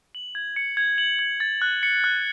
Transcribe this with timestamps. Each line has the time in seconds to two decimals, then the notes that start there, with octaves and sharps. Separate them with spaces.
0.15 F#7
0.35 G#6
0.56 C#7
0.77 G#6
0.98 F#7
1.19 G#6
1.40 A6
1.62 F#6
1.83 C#7
2.04 F#6